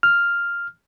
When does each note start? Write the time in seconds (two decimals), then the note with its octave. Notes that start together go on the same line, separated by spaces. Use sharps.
0.03 F6